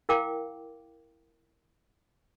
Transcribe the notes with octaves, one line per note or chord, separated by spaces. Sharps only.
E4 A#4 F5 G5 D6